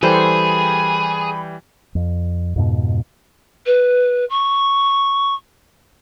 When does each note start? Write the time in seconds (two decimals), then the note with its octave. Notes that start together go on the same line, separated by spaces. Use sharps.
0.03 E3 G3 G#4 A4 C5 G5 B5
1.95 F2
2.56 F2 G#2 B2
3.66 B4
4.30 C#6